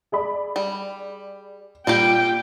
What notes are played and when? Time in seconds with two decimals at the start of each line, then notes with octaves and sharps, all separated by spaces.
0.12 G#4 D5 B5
0.56 G3
1.87 A#2 G3 A#3 G4 G5